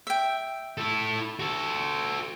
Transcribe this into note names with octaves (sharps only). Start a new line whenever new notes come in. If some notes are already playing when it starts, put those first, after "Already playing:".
E5 G5
E4 A4
F#4 A4